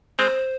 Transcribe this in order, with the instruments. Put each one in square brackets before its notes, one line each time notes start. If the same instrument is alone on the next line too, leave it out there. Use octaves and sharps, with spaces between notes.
[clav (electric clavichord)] G#3 C4 [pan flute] C5